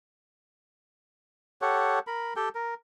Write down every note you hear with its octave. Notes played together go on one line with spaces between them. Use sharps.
G4 A4 C#5 F#5
A#4 B5
G4 A4 G5
A#4